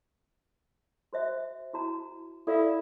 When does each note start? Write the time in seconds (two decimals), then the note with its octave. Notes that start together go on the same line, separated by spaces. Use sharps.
1.13 F#4 C5 E5
1.73 E4 F#4 A#5
2.47 E4 A4 D5 F5